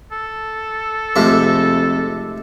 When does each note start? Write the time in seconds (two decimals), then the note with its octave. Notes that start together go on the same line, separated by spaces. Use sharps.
0.12 A4
1.16 F2 G#2 C3 A3